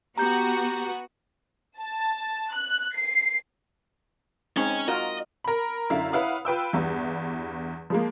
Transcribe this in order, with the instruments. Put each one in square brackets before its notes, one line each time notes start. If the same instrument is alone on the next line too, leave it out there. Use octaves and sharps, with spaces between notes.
[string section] B3 F#4 F#5 [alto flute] G4 [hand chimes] A#5 G6
[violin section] A5
F#6
C7
[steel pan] G#3 C4 D#4 [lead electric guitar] C#4
[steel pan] F4 F#4 A#4 [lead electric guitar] D#5
[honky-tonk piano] A#4 B5
F#2 D3 E4 E5 F5
E4 B4 C#5 F5 F#5 D#6
F4 B4 G5 E6
E2 G2 E3
F3 G#3 A#3